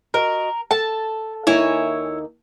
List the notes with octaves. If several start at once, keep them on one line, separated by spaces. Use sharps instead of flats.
F#4 A#4 D#5
A4 A5
D#2 A#3 D#4 E4 C#5 G#5